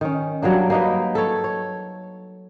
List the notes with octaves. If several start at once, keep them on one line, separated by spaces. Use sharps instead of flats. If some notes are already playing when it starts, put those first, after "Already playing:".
D#3 C#4
F#3 G3 A#3 D4
A#3 D#4 B4
A4 C#5
C#5